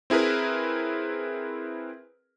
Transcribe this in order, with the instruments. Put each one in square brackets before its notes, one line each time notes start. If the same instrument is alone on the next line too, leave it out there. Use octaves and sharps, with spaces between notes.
[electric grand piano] C4 E4 G#4 A#4 B4